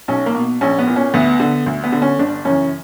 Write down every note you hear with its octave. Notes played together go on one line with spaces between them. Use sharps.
B1 C#4
A#3
B2
A#1 C#4
B3
A#2
C#4
D2 B3
D3
D2
B3
D3
C#4
G1 D4
F#2 C#3 E3 C#4